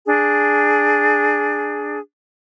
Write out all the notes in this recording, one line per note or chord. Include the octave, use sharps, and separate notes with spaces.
D4 G#4